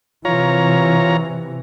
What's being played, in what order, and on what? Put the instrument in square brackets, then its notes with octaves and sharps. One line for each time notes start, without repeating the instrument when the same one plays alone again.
[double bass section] C3 E3 [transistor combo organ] F4 C#5 A#5